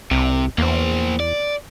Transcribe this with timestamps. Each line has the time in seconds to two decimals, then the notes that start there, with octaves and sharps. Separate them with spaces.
0.11 C2 C3
0.58 E2 A#3 C5
1.20 D5